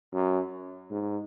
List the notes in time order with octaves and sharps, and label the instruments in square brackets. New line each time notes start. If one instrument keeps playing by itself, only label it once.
[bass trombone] F#2
G#2